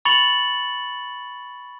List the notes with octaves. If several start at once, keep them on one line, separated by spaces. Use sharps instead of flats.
B5 C#6 A6 C#7 F7 F#7